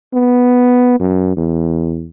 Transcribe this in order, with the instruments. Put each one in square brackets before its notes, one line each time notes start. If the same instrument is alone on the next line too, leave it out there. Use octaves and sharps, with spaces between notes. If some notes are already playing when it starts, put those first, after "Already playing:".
[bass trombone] B3
F#2
E2